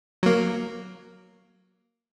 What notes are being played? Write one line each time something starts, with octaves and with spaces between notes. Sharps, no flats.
F#3 A#3